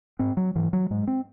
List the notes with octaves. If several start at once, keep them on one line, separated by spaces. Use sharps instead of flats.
G#2 C4
F#3
G#2 E3
F#3
G#2 G#3
C4